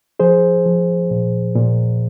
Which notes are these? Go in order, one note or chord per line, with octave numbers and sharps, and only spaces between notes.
F3 G#4 C5
F3
A#2
A#2